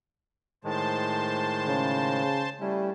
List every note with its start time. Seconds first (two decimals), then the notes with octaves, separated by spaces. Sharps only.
0.64 A2 D#3 G#3 C5 A5
1.67 C#3
2.61 G3 A3 C#4 E4